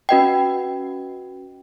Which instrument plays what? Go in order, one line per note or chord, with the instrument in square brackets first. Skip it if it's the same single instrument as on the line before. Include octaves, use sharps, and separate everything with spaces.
[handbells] C#4 F#4 B4 D#5 F#5 G5